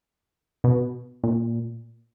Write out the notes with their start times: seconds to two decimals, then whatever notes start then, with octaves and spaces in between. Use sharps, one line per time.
0.64 B2
1.24 A#2